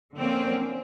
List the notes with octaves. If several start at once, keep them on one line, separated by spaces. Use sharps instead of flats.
D3 F3 A#3 C4 C#4